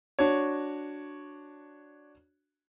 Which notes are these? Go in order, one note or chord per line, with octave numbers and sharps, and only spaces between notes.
D4 F#4 C#5